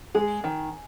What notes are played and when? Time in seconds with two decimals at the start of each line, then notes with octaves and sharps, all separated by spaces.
0.15 G#3 G#4
0.44 D#3